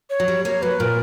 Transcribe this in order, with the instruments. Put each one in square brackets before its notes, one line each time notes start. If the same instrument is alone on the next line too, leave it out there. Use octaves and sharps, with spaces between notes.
[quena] C#5
[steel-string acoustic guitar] F#3
G3
[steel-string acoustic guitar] A#3 [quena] C#5
[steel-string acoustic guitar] F#3 [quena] B4
[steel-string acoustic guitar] A#2 [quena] A#4